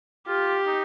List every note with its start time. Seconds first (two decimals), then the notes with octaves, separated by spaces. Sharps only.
0.27 F4 G4
0.66 D#4